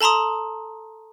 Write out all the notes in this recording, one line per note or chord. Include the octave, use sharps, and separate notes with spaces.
A4 A5 A#5 C6 D#6